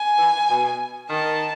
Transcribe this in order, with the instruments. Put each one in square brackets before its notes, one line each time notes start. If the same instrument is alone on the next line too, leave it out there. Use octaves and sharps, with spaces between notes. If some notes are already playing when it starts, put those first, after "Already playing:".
Already playing: [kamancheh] G#5
[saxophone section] E3
B2
[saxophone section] D#3 [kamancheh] A5